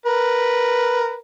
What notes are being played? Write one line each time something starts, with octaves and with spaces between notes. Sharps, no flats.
A#4 B4